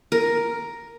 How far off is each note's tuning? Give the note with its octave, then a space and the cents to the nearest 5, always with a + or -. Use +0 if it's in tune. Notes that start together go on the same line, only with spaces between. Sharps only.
A#4 +5